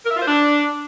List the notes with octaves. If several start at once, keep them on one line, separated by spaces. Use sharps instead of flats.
A#4
E5
F4
C5
D4